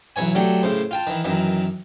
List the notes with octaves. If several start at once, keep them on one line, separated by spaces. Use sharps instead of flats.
B1 E3 C#5 G#5
F#3 A3 D4 G4
A2 C#3 C5
F4 G5 A5
D#3 E3
F#2 D#3 E3